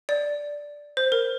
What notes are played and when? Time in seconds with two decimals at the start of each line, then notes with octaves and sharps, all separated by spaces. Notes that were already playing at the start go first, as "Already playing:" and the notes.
0.09 D5
0.97 C5
1.12 A#4